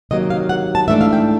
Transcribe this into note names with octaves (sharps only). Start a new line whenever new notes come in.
C3 D#3 F#3 A#3 D#5
F5
F#5
A5
G#2 E3 A3 D4 E5
F5
G5